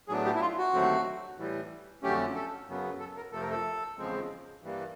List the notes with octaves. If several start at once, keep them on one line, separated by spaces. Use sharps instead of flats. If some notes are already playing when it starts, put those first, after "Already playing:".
A2 F#3 B3 D4 G#4
G4
E4
F4
F#4
D#2 D3 F#3 A3 C4
A2 E3 G3
F2 D3 F#3 A3 C#4 G4
A4
F#2 C#3 F#3 B3
A4
A#4
F2 C3 F3 A3 A4
A#4
A4
E2 C#3 F3 G#3 C4
G2 E3 G3 A#3